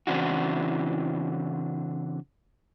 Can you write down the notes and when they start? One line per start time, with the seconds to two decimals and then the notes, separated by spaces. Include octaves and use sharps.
0.07 C#3 E3 C4 D4 E4 F#4